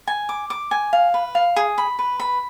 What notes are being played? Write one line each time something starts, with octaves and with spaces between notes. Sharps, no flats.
G#5
D6
D6
G#5
F5
B4
F5
G#4
B5
B4
B5